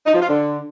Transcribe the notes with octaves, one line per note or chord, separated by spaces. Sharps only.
D#4
F3
F4
D3